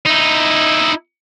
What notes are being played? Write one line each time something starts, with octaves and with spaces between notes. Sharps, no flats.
D#4 E4